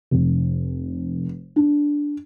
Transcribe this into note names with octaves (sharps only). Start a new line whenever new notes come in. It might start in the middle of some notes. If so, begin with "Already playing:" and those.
F1
D4